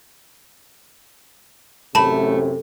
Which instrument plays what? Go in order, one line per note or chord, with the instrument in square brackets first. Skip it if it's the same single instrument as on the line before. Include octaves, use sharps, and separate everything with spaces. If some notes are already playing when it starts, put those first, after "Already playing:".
[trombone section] A1 F#2 C3 [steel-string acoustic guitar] A3 [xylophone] A5 B5